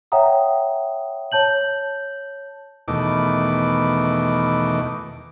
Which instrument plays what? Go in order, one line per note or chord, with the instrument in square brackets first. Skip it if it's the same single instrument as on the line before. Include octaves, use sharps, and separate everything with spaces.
[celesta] C#5 E5 F#5 G5 A#5 D#6
C#5 A5 G6 F#7
[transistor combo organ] E2 B2 D#3 A3 D6